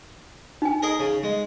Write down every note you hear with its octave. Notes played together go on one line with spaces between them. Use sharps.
D#4 G#5
G#4 A#4 D#5
C#3
G#3